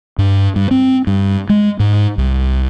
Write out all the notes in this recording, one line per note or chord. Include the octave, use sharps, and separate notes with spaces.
G2
G2
C4
G2
G#3
G#2
C2